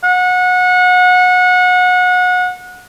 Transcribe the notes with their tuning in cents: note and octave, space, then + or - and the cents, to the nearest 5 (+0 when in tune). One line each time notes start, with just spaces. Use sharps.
F#5 -30